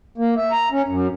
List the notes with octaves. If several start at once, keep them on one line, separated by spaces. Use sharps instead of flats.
A#3
E5
A#5
C#4
F#2